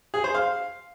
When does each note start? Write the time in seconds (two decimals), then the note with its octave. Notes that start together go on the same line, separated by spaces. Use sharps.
0.14 G#4
0.24 C5
0.35 F5